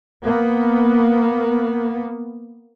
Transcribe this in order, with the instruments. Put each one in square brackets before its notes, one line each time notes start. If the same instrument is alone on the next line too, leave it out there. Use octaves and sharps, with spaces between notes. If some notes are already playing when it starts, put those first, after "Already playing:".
[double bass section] A#3 B3